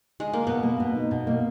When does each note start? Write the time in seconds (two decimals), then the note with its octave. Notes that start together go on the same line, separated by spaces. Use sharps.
0.20 G#3
0.33 A#3
0.47 B2 B3
0.63 A#3
0.80 B2
0.95 D#4
1.11 B2
1.27 A#3